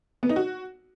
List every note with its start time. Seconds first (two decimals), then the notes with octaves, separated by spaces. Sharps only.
0.23 B3
0.29 D#4
0.36 F#4